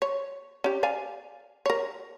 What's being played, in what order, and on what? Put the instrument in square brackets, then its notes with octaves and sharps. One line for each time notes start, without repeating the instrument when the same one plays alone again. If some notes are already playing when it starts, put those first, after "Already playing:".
[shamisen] C#5
C#4 G4
D5 F5 G#5
A#4 C#5